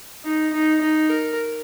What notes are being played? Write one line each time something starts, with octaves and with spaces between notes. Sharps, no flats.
D#4
D#4
D#4
A#4